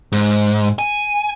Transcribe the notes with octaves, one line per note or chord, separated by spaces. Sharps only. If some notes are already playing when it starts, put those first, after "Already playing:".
G#2
G#5